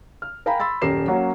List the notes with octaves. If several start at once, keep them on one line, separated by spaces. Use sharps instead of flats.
F6
A#4 F5 G5 G#5 A#5 B5
B5 C6 E6 A6
D#1 F#2 G4 A#4 C7 E7
F#3 A#3 C#4 F#4